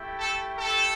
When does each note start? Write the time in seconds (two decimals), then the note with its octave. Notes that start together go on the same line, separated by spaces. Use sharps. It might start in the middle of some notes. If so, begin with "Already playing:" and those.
Already playing: A3 E4 G4
0.17 A4
0.56 A4